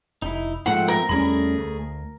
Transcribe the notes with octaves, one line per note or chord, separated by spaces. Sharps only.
F1 D#4 E4
G#2 F3 A3 C4 F#5
A#4
E2 G3 A3 C#4 G#4 B5
D2